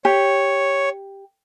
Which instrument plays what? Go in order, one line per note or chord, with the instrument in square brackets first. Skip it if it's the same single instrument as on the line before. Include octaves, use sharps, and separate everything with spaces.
[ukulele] G4 [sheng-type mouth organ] C#5